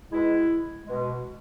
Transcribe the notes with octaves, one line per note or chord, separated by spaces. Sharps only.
B2 G#3 E4
B2 G#3